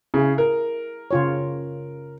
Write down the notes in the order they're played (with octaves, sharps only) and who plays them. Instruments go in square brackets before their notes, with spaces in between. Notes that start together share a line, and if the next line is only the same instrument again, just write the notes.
[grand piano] C#3 [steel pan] E4 G#4
[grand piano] A#4
[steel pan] C#3 F4 C#5